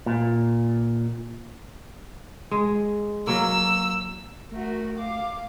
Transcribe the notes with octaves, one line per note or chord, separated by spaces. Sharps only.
A#2
G#3
F#3 A#3 E6
A3 F#4 A#4
F5 D6